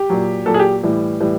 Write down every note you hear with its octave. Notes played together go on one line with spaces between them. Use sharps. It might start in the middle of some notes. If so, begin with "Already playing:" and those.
Already playing: G4
A#2 F#3
A#2 F#3 A4
G#4
G4
A2 E3 G3
A2 E3 G3